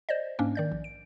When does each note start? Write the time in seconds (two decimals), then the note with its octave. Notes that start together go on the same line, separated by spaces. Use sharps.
0.09 C5 D5 D#5
0.39 G#2 A#3 C#4 D4
0.55 D#3 D5 G6
0.72 A#1
0.84 D7